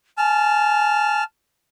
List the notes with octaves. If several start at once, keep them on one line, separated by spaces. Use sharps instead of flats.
G#5 A5 F6